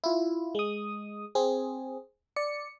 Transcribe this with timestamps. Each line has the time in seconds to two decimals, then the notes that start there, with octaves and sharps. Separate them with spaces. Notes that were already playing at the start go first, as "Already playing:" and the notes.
0.04 E4 F4
0.55 G#3 D#6
1.35 C4 G#4
2.36 D5 C#7